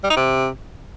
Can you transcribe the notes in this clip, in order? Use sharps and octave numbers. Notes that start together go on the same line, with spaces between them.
G3
D#4
C3